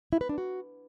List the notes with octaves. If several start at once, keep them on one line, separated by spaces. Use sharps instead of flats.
E4
B4
D4
F#4